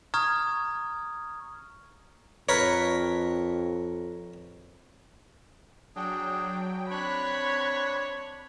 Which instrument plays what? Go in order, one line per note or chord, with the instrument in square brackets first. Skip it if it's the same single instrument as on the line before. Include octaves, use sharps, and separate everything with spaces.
[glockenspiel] A#5 C#6 D#6 F6 G#6
[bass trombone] F2 [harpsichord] A#4 B4 C#5
[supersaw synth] F#3 G5 [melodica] D4 G#4
[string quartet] C4 B5 [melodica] D4 [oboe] C#5 [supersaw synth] F#6 B6